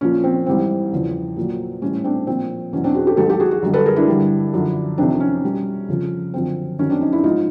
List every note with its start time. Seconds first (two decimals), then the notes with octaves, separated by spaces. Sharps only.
0.01 A#2 F3 C#4
0.24 C4
0.46 G#2 E3 G3 C4
0.93 E2 C#3 F3
1.36 A#2
1.42 F#3
1.82 A2 E3 G3 C#4
2.04 C4 D4
2.27 A#2 F3 C4
2.73 E2 B2 F#3 C#4
2.84 C4 D4
2.95 F#4 G#4
3.07 G4 A4
3.17 G#2 D#3 F#3 G4 A4
3.30 G4 A4
3.40 F#4 G#4
3.51 F#4 G#4
3.63 F#2 D3 G3
3.74 A4 B4
3.85 G#4 A#4
3.96 D4 E4
4.08 G2 D3 G3
4.53 F#2 D3 F3
4.98 F2 C3 D#3 C4 D4
5.20 C#4
5.43 B2 G3
5.88 F2 C#3 F3
6.34 F#2 D3 F3 C4
6.79 F#2 D#3 F#3 C#4
6.90 C4 D4
7.01 C#4 D#4
7.12 D4 E4
7.23 G#2 F3 D#4 F4